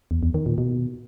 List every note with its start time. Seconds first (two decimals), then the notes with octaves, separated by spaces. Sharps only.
0.11 E2
0.23 E2
0.34 D#3
0.46 A#2
0.58 B2